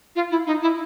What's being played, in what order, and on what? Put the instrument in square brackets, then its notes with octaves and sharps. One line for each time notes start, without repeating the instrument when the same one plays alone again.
[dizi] F4
E4
D#4
E4